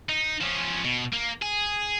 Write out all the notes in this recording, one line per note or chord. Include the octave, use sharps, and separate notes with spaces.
D#4
F3 C#4
B2
A#3
G#4